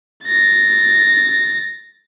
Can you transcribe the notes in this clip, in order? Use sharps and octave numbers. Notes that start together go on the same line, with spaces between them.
A6 A#6